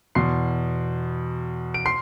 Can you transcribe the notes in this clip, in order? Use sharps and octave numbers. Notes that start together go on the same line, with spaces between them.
E2 B2 C6 C7
D7
C6 C7